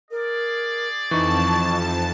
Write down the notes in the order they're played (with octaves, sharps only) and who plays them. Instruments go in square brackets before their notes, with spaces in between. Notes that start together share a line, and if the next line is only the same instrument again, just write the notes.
[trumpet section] G#4 D5 [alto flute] A#4
[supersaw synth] F2 A5 [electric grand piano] E3 D#4 [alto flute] C#6